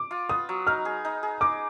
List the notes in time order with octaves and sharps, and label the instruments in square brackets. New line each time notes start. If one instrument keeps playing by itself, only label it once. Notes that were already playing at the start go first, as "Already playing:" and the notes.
Already playing: [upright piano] D6
[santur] F4
[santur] B3 [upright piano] D#6
[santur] F#3
[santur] D#4 [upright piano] F6
[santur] G#4
D#4
G#4
[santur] D#4 [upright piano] D6